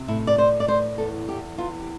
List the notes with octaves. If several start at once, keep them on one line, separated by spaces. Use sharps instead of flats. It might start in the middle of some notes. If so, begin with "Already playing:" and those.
Already playing: C3
A2 E4
D5
A2 C5
D5
A2 C5
E2 A4
E2 G4
E2 F4
G4